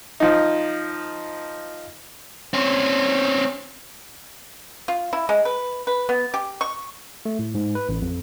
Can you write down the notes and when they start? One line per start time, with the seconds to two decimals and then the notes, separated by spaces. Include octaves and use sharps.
0.20 F3 D#4
2.53 C4 C#4
4.88 F4
5.13 E4
5.29 G#3
5.45 B4
5.87 B4
6.09 B3
6.34 G4
6.61 C#6
7.25 A3
7.39 A2
7.55 G#2
7.75 B4
7.89 A1
8.02 F2